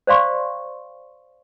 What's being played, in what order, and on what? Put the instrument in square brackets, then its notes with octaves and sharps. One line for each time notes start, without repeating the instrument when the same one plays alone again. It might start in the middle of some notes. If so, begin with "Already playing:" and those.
[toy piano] C5 D5 F5 C6 C#6